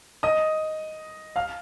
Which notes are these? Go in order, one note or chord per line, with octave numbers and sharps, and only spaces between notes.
D#5 D#6
F5 F6